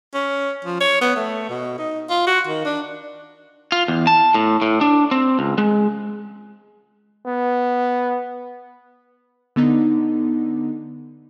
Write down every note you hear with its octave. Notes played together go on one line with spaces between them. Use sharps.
C#4
F3
C#5
B3
A3
B2
D#4
F4
F#4
D#3
D4
F4
E2
A5
A2
A2
D4
C4
C#2
G#3
B3
D3 B3 D#4